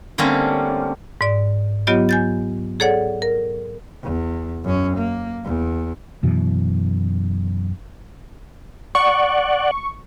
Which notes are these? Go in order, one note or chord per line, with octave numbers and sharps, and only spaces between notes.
D3 G3 A3 A#3 C4 C#4
G#2 D5
F#3 B3 F4 G4 C#5 D#5
G#5 G6 A6
G#4 A4 C#5 D5 F#5
A#4
E2
F#2 C#4
A#3
E2
F#2 B2 E3
D5 F#5 C#6